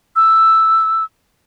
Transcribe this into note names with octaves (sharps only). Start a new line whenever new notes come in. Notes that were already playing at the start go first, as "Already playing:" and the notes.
E6